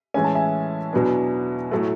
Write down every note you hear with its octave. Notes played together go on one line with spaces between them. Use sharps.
A2 E3 G#3 C#4 G#5
A5
E5 G#5
E2 B2 F#3 B3 D4
A2 F#3 A3